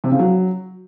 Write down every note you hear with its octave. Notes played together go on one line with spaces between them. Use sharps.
C3
C#3
F#3